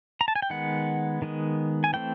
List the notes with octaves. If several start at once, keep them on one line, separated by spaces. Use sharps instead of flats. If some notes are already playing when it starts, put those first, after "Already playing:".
A#5
A5
G#5
G5
D#3 G#3 B3 F#5
D#3 G#3 B3
G#5
E3 A3 C4 G5